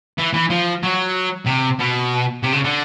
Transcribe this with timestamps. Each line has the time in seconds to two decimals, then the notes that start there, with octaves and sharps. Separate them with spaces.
0.18 E3
0.34 E3
0.50 F3
0.83 F#3
1.46 C3
1.79 B2
2.43 C3
2.52 C#3
2.64 D3